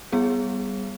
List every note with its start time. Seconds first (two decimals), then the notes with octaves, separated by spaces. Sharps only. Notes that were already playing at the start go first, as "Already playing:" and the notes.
0.12 G3 B3 G#4